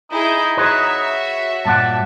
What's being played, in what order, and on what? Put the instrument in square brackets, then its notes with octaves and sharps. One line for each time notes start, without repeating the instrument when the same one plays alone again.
[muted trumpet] D#4 [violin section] E4 G#4 G6
[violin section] F#4 C#5 E5 [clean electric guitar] G#4 B4
[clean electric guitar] G2 A#2 F#5 [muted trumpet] A5